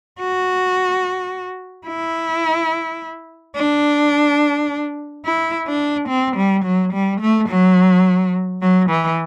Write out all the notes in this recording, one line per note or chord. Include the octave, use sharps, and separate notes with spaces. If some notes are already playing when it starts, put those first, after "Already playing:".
F#4
E4
D4
E4
D4
C4
G3
F#3
G3
A3
F#3
F#3
E3